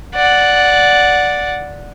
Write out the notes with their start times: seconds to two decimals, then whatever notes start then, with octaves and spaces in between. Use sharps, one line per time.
0.15 D5 F#5